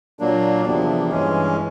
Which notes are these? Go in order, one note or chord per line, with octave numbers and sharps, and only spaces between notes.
A#2 F#3 A#3 D4
E2 C3 F3 A#3 D4
G2 E3 G#3 C#4